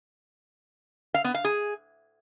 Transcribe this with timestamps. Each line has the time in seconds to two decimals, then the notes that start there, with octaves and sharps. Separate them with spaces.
1.14 F5
1.24 B3
1.34 F5
1.44 G#4